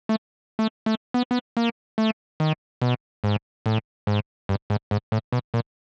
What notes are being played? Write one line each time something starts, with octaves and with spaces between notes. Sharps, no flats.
A3
A3
A3
B3
B3
A#3
A3
D#3
B2
G#2
A2
G#2
G2
G#2
G#2
A2
B2
A#2